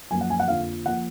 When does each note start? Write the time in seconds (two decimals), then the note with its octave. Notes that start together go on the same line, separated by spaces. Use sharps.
0.11 F#2 F3 A#3 G#5
0.21 F#5
0.30 G#5
0.40 F#5
0.48 F2 D3 F3 A#3 F5
0.86 F3 A#3 F#5